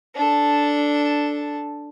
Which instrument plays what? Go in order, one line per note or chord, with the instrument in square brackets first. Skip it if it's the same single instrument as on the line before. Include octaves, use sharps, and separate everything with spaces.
[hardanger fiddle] D4 A4